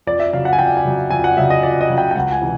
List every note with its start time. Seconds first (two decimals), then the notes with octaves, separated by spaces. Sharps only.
0.07 F2 D5
0.20 E5
0.33 C#3 F#3 F5
0.45 F#5
0.53 G#5
0.59 F2 G5
0.77 G#5
0.84 C#3 F#3
1.10 F2 G#5
1.24 F#5
1.37 C#3 F#3 E5
1.50 D#5
1.63 F2 D5
1.81 D#5
1.89 C#3 F#3
1.98 G5
2.11 G5
2.15 C#2 F#5
2.32 G#5
2.41 C3 E3